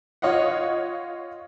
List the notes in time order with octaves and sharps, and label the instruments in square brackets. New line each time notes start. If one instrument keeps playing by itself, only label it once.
[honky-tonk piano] F4 C#5 D#5 F5 F#5